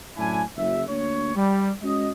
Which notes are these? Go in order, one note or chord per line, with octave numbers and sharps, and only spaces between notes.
F#2 A2 F#3 D4 E4 G#5
F#1 E5
D2 A#3 D4 C#5
G3
G#3 C#4 F#4 D#5